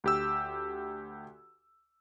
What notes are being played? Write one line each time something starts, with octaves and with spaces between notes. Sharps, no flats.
D2 G4 E6